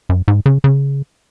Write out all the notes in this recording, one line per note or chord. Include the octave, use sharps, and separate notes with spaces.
F#2
G#2
C#3
C#3